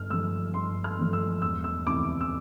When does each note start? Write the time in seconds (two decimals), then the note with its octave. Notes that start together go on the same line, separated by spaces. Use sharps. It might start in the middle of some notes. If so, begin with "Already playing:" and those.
Already playing: G1 F6
0.10 G2 F3 A3 E6
0.54 G1 C6
0.84 F6
0.98 G2 F3 A3
1.13 E6
1.42 E1 E6
1.64 E6
1.86 D2 C3 E3 D6
2.21 E6